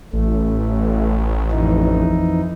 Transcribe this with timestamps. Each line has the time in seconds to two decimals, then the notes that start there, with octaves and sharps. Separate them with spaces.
0.13 A1 A3
1.51 F2 E3 D#4